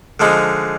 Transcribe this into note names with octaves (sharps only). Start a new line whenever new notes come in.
D3 F3 G#3 D#4